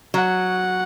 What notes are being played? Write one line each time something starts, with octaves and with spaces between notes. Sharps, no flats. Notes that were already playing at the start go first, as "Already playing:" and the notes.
F#3 F#5